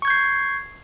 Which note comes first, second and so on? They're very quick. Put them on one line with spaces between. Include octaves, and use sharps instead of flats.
C#6 G#6 G6 C7